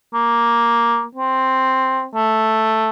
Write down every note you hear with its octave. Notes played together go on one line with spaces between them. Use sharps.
A#3
C4
A3